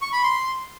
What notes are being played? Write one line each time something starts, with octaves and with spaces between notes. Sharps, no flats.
C#6
B5
C6